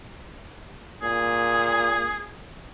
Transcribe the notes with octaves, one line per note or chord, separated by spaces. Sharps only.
A#2 G#4